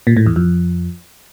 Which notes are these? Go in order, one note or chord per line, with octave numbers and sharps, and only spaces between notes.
A#2
A2
E2
F2